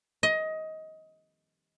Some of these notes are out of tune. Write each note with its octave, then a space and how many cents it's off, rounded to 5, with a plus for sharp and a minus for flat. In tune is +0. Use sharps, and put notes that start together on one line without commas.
D#5 +20